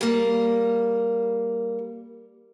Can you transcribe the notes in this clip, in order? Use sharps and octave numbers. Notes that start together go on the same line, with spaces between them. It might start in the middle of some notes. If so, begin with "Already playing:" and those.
G3 A#3